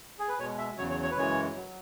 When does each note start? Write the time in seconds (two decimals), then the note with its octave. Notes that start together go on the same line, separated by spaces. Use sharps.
0.19 G#4
0.29 B4
0.38 B2 G#3 C#5
0.58 E5
0.77 E2 C#3 F#3 C#5
0.90 C#5
1.03 C#5
1.11 B4
1.16 F#2 C#3 E3 G#3 C#5
1.55 F#3